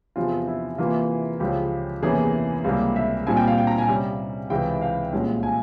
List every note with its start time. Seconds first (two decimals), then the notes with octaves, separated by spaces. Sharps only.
0.16 E2 C3 F3 F4
0.48 E4
0.78 C3 E3 A#3 F4
1.40 C#2 C#3 F3 G#3 G4
2.02 E2 C3 E3 A#3 C#4 G#4
2.64 C#2 C3 G3 A#3
2.96 E5
3.26 A#2 G3 C4 G#5
3.37 G5
3.47 F5
3.58 G5
3.67 A#5
3.78 G#5
3.88 C3 G3 C#4
4.50 C#2 C3 E3 G5
4.81 F5
5.12 C2 A#2 G#3 C#4
5.43 G#5